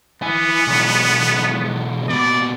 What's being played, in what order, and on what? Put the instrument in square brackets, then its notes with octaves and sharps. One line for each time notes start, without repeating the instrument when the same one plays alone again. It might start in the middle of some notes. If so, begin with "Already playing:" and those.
[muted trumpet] B3 [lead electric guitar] E4 G#5
[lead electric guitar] B1 E2
[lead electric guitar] A#2 B3 [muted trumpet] D5